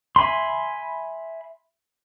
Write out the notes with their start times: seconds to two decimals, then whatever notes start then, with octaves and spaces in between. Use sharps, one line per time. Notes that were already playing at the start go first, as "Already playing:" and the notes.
0.16 E5 G#5 B5 C6